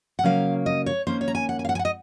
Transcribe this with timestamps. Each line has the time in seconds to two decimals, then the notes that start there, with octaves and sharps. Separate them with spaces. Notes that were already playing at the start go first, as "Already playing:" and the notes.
0.19 F#5
0.24 C#3 F#3 A#3 C#4 F5
0.66 D#5
0.86 C#5
1.07 D#3 A#3 C#4 C5
1.21 C#5
1.28 A#5
1.35 G#5
1.49 F#5
1.59 G#5
1.65 F5
1.69 F#5
1.75 G#5
1.79 F#5
1.85 D#5